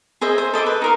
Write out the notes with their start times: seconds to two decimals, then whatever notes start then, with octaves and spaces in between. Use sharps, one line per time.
0.21 G#4 C5 D#5 E5
0.38 C5
0.54 A4 D#5 B5 D6
0.66 B4
0.82 D#4 A#4 C6